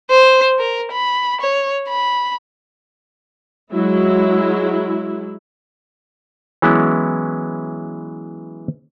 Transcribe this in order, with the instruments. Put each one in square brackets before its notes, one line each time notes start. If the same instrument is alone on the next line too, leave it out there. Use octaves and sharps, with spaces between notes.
[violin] C5
A#4
B5
C#5
B5
[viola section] F#3 G#3 E4
[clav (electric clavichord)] E3 F#3 G#3 B3 C#4 E4